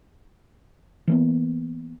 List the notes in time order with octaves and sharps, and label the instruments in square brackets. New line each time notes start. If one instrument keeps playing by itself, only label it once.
[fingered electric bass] E3 A#3 B3